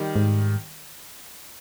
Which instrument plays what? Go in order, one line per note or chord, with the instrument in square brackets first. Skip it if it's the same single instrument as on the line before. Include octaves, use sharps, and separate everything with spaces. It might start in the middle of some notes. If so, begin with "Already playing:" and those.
Already playing: [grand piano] D#3 G3
[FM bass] G#2